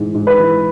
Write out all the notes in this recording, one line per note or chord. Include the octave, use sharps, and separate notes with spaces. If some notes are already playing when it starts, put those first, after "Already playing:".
Already playing: G#2 E3 G#3
G#2
B4
E3